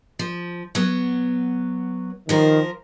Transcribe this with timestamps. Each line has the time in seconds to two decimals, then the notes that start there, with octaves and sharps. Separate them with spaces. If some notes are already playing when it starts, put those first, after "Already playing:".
0.19 F3
0.75 F#3 B3
2.29 D#3 F3 A#4 C5